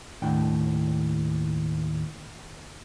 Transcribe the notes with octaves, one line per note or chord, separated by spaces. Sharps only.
D#2 A2 D4 F#5 G5